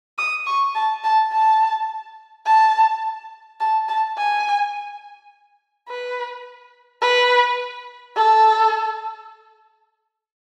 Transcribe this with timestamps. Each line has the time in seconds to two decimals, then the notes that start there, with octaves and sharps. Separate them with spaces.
0.18 D#6
0.47 C#6
0.75 A5
1.04 A5
1.32 A5
2.46 A5
3.60 A5
3.88 A5
4.18 G#5
5.89 B4
7.01 B4
8.16 A4